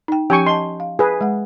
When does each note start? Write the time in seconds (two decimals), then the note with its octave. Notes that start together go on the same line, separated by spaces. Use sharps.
0.08 D#4 G5
0.30 F3 C#4 G4 G5 G#5 C#6
0.47 D#5 A5 C6
0.80 F5
0.99 G#4 B4
1.21 G#3 F#5